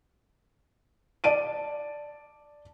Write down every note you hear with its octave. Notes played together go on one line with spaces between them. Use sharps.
D5 A5 D7 D#7